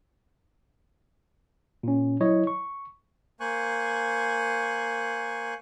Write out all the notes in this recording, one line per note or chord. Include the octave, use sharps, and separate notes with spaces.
A#2 C#4
F#3 E4 C#5 D#5
C#6
A#3 C5 G#5 C#6 F#6